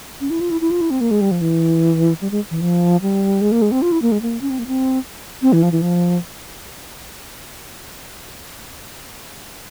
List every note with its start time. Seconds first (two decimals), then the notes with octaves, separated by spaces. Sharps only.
0.21 C#4
0.30 E4
0.41 F4
0.51 E4
0.61 E4
0.71 F4
0.81 E4
0.90 C4
1.01 A#3
1.11 G#3
1.21 G3
1.31 F3
1.41 E3
2.21 G3
2.31 G#3
2.51 E3
2.61 F3
3.02 G3
3.41 G#3
3.52 A#3
3.62 G#3
3.72 C4
3.82 F4
3.92 E4
4.02 A#3
4.12 G#3
4.22 A#3
4.41 C#4
4.50 C4
4.59 A#3
4.67 C4
5.42 C4
5.53 E3
5.63 F3
5.72 E3
5.82 F3